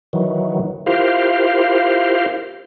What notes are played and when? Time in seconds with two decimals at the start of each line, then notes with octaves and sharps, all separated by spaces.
0.13 D#3 E3 F#3
0.86 E4 F4 G4 A#4 C5 F5